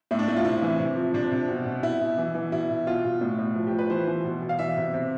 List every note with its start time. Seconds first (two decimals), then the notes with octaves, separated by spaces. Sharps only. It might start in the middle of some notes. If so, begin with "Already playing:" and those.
0.11 A2 E4
0.19 D4
0.28 A2 E4
0.37 F4
0.45 C3 E4
0.62 E3
0.79 C3
0.96 F3
1.14 C3 D4
1.31 C3
1.48 B2
1.65 B2
1.83 B2 E4
2.01 B2
2.18 E3
2.34 E3
2.52 B2 E4
2.70 B2
2.87 B2 F4
3.04 B2
3.21 A2
3.38 A2
3.56 F3
3.67 G4
3.72 F3
3.79 B4
3.90 E3 C5
4.07 E3
4.24 B2
4.42 B2
4.49 F5
4.59 E3 E5
4.77 C3
4.94 C3